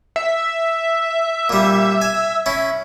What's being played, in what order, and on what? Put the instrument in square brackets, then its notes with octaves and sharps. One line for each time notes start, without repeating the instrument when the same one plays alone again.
[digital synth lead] E5
[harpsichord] A#2 G3
G#5
C#4 E4